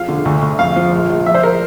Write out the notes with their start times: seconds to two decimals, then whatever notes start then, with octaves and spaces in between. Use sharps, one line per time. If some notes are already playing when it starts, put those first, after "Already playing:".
Already playing: F2 F3 F5
0.09 D3
0.25 D2
0.42 D2
0.59 F2 F5
0.76 F3
0.93 A#1
1.10 A#1
1.26 F3 E5
1.35 C5
1.43 A#4